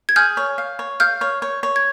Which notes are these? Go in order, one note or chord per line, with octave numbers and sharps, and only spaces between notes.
G#6
G#4 F6 G6
C#5
F5
C#5
F5 F6 G6
C#5
C#5
C#5
G#6